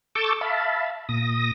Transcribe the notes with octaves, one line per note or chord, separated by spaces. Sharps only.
A4 C#6 D6 E6 G6 A6
E5 F5 A5 B5
A#2 D#6 A#6